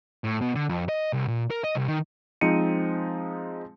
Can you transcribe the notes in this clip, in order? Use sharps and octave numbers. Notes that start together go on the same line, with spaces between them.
A2
B2
D3
F2
D#5
C2
A#2
A#4
D#5
C2
D#3
F3 G#3 C4 D#4 C#7 D#7